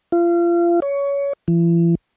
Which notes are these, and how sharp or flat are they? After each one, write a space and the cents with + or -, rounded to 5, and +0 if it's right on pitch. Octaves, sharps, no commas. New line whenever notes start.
F4 -30
C#5 +20
E3 +40